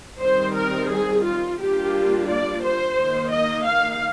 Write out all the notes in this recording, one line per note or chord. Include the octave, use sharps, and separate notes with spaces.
D#3 G3 C4 D#4 C5
A#4
G#4
F4
G3 A#3 D4 F4 G4
D5
C5
D#3 A#3 D#4
D#5
F5